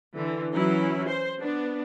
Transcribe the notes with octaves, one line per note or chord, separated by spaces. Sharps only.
D3 E3
E3 F#3 C#4 E4
C5
B3 D4